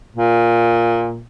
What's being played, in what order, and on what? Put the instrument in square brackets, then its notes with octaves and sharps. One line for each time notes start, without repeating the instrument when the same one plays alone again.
[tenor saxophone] A#2